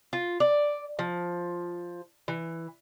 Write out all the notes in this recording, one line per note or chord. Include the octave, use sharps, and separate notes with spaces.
F4
D5
F3
E3